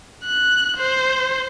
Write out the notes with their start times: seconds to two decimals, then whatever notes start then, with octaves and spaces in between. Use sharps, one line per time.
0.24 F#6
0.77 C5